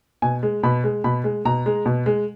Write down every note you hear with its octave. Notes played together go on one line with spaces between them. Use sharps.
B2 G#5
G#3
B2 B5
G#3
B2 B5
G#3
B2 A#5
G#3
B2
G#3